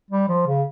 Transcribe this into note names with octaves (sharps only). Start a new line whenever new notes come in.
G3
F3
C#3